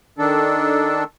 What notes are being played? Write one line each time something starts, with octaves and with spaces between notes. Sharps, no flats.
D#3 D4 A4